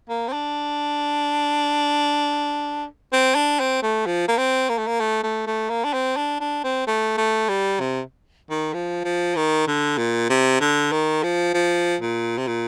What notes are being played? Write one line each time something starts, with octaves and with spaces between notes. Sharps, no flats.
A#3
C4
D4
C4
D4
C4
A3
F3
A#3
C4
A#3
A3
A#3
A3
A3
A3
A#3
D4
C4
D4
D4
C4
A3
A3
G3
C3
D#3
F3
F3
D#3
D3
A#2
C3
D3
D#3
F3
F3
A#2
C3
A#2